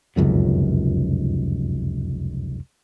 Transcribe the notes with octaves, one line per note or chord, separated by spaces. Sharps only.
F1 C#2 F#2 B2